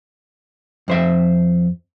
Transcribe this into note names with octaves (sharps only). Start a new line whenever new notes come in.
F2 C5 E5